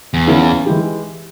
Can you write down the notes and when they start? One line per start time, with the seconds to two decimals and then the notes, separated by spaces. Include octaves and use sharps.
0.14 E2
0.26 E3 A#3 C#4 E4 G#4
0.66 E3 G#3 E4 G4